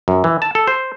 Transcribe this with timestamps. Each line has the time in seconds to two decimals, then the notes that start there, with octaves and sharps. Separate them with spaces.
0.08 F#2
0.24 E3
0.42 A5
0.55 A4
0.67 C5